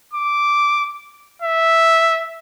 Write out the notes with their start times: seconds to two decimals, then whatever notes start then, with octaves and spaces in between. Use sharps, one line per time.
0.13 D6
1.42 E5